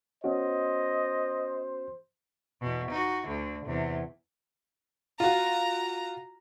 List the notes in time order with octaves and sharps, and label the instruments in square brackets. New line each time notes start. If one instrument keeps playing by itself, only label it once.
[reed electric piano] B3 C#4 F#4 [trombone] C5 [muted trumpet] D#5
[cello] E2 B2
D#4 F#4
D2 D3
E2 C3
[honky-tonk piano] F4 F#4 [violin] A#5